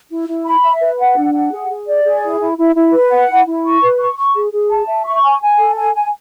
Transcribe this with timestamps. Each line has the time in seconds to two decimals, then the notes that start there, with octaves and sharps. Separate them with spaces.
0.10 E4
0.28 E4
0.45 B5
0.64 E5
0.81 B4
0.99 F#5
1.16 D4
1.34 F#5
1.52 G#4
1.69 G#4
1.87 D5
2.05 G#4
2.23 E4
2.40 E4
2.58 E4
2.75 E4
2.93 B4
3.11 F#5
3.29 E4
3.47 E4
3.64 C#6
3.82 B4
3.99 C#6
4.17 C#6
4.35 G#4
4.52 G#4
4.70 A5
4.87 E5
5.05 C#6
5.23 G#5
5.41 G#5
5.59 A4
5.76 G#5
5.94 G#5